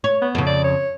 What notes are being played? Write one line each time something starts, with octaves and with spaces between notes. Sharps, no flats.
C#5
B3
F2 C#3
D5
C#5